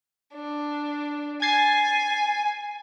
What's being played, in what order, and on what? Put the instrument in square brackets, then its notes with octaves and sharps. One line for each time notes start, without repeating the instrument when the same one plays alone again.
[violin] D4
[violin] G#5 [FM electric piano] G#6 A6 C7